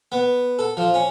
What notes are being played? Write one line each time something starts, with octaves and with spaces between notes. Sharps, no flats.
B3
A4
F3
C#4